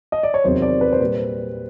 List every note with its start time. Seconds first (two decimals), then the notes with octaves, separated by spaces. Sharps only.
0.12 D#5
0.23 D5
0.34 C#5
0.44 E2 C3 D#3 F#3 C5
0.62 D5
0.81 B4
0.93 C5
1.00 A#2 G3 B4